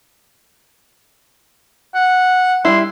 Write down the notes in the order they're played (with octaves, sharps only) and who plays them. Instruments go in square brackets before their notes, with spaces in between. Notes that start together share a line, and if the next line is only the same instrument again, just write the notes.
[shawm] F#5
[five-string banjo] G3 E4 [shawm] C6